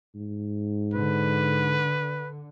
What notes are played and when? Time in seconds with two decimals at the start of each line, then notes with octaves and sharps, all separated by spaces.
0.15 G#2
0.94 D3 B4